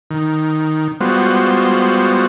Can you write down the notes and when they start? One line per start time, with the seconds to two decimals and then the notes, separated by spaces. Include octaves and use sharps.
0.11 D#3
1.01 G3 G#3 B3 F4 F#4 C5